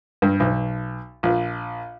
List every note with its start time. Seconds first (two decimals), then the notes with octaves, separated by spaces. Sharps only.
0.22 G2
0.40 B1
1.23 A#1